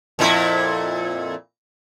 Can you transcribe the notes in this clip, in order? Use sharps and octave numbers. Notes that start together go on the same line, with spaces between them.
F2 A#2 E4